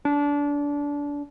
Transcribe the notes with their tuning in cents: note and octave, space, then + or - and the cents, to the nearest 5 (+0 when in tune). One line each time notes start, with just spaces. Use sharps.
D4 -25